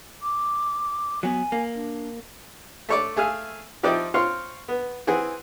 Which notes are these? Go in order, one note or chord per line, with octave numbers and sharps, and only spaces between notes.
D6
F#3 B3 G#5
A#3
D4
A3 C#5 D5
A3 G#4 E5 F5 G#5
F3 C4 D#4 E4 G4 D5
C4 F4 C#5 F5 C6
B3
E3 C4 G#4 F#5